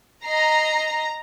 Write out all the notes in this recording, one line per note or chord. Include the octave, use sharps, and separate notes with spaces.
D#5 A#5 C7